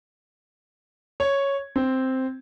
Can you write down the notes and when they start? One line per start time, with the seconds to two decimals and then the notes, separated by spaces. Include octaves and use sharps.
1.20 C#5
1.76 C4